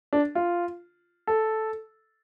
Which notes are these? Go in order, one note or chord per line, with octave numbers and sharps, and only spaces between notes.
D4
F4
A4